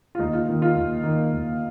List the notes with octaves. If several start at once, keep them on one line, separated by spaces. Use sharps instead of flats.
F4
D#2 D#4
F4
D#3 A#3 D#4
F4
D#2
D#3 A#3 D#4
D#2